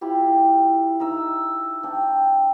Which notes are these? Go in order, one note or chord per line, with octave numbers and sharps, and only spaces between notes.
E4 F4 G4
D#4 E6
D4 G5